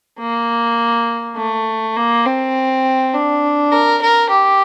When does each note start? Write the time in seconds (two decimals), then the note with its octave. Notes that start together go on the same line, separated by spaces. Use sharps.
0.20 A#3
1.37 A3
1.97 A#3
2.25 C4
3.13 D4
3.72 A#4
4.02 A#4
4.30 G4